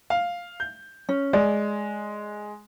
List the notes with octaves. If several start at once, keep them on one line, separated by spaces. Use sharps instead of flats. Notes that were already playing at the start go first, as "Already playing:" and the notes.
F5
G6
C#4
G#3 D5